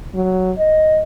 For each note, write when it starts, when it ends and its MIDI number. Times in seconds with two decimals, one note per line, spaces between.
0.14 0.51 54
0.58 1.02 75